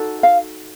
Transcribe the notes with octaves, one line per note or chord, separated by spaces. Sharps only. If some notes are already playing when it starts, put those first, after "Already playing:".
Already playing: D#4 F#4 A4
F5